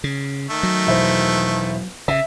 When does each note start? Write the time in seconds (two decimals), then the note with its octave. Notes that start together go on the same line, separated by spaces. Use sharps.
0.04 C#3
0.50 D#3 A3
0.63 F#3
0.87 E1 E4 C5
2.08 C#3 E5